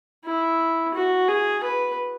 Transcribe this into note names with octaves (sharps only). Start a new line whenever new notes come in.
E4
F#4
G#4
B4